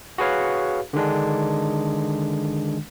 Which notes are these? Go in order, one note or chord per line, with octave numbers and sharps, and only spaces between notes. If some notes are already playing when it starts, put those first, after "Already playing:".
F#4 G#4 B4 C#5 F5
D3 D#3 G#3 D4